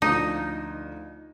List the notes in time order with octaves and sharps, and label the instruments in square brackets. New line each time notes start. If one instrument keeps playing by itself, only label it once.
[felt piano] D2 F3 [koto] D#4